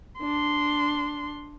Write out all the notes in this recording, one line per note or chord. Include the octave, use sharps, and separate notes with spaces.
D4 C6